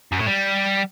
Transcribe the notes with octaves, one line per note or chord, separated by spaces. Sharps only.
F#2
A2
G3